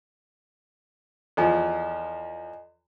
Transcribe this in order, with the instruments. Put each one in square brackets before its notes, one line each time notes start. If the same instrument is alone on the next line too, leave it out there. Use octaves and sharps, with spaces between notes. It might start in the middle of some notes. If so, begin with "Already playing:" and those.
[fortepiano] E2 F3 [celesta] A4 D#5 G#5